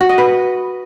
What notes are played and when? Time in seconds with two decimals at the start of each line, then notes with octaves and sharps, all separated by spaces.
0.01 F#4
0.09 D#5
0.18 B4